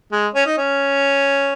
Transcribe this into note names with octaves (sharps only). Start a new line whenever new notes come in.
G#3
C#4
D#4
C#4